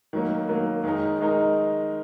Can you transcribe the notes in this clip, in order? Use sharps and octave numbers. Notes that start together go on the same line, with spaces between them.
D#3 F#3 A#3
D#3 F#3 A#3
D#3 G#3 D#4 A#4
D#3 G#3 D#4 A#4